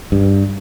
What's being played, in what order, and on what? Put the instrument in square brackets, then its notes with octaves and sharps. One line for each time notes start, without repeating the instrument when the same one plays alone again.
[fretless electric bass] G2